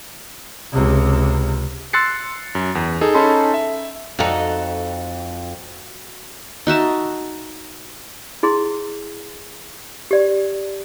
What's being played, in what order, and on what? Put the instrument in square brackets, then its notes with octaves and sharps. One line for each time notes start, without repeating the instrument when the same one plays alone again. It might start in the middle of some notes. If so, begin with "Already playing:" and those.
[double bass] C#2 C3
[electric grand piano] C6 E6 F#6 A6 C7 C#7
F#2
E2
D#4 G#4 A4
C#4 D#4 A4 A5 B5 C6
E5
[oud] F2 D#4 [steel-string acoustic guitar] F#4 A4 G5
[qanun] D#4 F#4 E5 A5
[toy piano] E4 G#4 C6
G4 D5